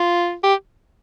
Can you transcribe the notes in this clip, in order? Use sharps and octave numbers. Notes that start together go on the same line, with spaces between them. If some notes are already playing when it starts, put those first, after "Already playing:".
Already playing: F4
G4